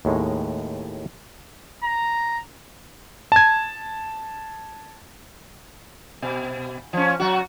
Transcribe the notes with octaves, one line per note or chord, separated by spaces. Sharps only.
D#2 A2 G#3 D#4
A#5
A5 G#6
B2
F3 C#4
F#3 F#4